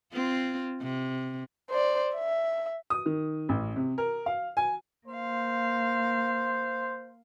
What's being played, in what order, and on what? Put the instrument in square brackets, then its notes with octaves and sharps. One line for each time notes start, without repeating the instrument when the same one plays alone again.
[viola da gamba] C4 F4
C3
[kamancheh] C5 D5
E5
[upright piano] D#6
D#3
A1
C3
A#4
F5
G#5
[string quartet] A#3 F5 [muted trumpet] C5